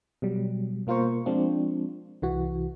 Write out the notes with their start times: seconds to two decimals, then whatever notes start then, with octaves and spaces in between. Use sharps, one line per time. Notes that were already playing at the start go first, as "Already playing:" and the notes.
0.22 B2 F#3 G3
0.87 B2 A#3 F4 A#4 C5 C#6
1.26 F3 G#3 C4 D4 F4
2.22 C2 E3 F#4